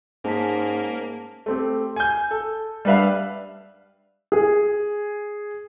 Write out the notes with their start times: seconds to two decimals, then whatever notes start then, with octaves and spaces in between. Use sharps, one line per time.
0.24 G#2 A#3 C#4 A5 B6
1.46 A3 C4 G4
1.96 G#5 G6
2.31 A4
2.85 G3 D4 B4 E5 F5
4.32 G#4